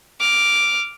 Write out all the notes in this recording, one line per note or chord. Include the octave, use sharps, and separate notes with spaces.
D6 F6